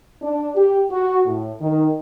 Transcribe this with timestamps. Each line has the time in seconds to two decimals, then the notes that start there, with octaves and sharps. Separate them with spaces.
0.22 D4
0.55 G4
0.90 F#4
1.26 A2
1.60 D#3